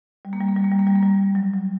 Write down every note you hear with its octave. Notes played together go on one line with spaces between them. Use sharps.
G3
A#3
G3
A#3
G3
A#3
G3
A#3
G3
A#3
G3
F#3
F#3